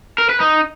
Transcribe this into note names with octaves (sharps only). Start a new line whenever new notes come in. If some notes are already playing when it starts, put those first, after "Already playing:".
A#4
B4
D#4